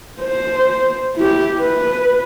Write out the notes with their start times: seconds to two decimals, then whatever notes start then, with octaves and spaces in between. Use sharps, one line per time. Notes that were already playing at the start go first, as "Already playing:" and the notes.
0.22 C5
1.16 E4 G4
1.61 B4